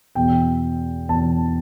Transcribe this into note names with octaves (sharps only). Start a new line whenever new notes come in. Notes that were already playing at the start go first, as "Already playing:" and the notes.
E2 B2 G5
E2 B2 A5